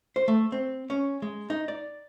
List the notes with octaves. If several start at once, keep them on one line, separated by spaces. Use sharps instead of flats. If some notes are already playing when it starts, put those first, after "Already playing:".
C5
A3
C4
C#4
G#3
D#4
D5